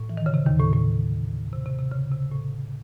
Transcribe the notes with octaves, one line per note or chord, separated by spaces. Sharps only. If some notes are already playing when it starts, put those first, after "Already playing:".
Already playing: A2
E3
D#3
C#3
C3
D#2 D#3
A2
A2
C3
C3
C3
C#3
C3
A2